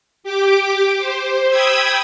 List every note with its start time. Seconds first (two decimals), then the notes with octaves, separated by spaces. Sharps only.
0.24 G4 D6
0.98 C5
1.49 G5 B5 D#6 E6 G#6